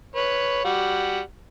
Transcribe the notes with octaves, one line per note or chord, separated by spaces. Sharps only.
B4 C#5
G3 F#4